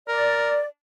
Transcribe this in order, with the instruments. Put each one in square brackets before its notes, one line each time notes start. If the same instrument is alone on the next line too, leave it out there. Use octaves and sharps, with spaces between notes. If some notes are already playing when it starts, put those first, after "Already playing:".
[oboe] A#4 [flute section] D5